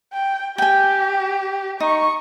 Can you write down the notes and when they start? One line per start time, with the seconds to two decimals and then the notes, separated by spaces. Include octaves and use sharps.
0.13 G5
0.58 G4 G5 G#5
1.80 D#4 C#6